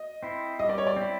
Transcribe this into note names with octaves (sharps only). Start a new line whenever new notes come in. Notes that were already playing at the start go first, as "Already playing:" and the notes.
Already playing: D#5
C4 E4
G3 D#5
D5
C#5
D5
C4 E4